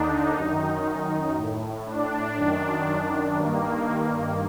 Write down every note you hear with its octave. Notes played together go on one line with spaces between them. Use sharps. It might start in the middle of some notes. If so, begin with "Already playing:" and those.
Already playing: D#2 D3 D4 D#4
F#2 D#3
A2
D4
F#2 D#3 D4
G2 D#3 A#3